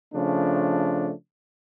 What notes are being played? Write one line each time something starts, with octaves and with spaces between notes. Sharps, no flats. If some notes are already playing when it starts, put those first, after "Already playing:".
C#3 F3 A3 D4